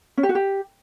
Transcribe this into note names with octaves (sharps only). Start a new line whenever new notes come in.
C#4
G4
F#4
G4